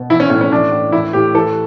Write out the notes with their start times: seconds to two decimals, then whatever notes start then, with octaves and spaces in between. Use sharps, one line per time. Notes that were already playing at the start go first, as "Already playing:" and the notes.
Already playing: B2
0.10 E3 E4
0.20 C#4
0.30 A2 C#4
0.41 C#4
0.52 E3 D4
0.72 A2
0.92 E3 E4
1.13 A2 G4
1.34 E3 A4